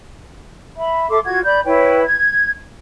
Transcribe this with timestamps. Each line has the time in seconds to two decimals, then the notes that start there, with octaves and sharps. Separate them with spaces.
0.76 E5 B5
1.09 A4 E5 C6 D6
1.25 F4 F#4 G#6
1.44 D5 B5 G6
1.64 E4 B4 C#5 G5
2.04 G#6